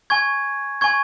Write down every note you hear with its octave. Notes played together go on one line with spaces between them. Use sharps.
G#5 C#6 G#6
G#5 C#6 G#6